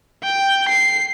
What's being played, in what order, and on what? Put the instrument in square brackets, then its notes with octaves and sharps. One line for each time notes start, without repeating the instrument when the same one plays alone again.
[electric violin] G5
C7